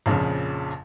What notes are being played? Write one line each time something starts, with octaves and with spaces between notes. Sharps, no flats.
A#1 F2 C#3